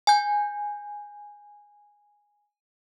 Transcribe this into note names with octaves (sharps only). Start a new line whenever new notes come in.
G#5 G6